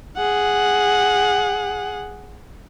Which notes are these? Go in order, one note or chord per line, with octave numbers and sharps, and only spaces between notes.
G#4 F#5